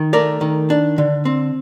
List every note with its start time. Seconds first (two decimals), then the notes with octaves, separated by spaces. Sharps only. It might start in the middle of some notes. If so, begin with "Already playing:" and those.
Already playing: D#3
0.13 A3 A#4 D5
0.41 D#3
0.70 D4
0.98 D3
1.25 C4